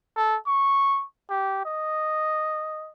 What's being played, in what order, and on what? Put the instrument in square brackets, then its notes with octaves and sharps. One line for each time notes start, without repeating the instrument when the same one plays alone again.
[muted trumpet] A4
C#6
G4
D#5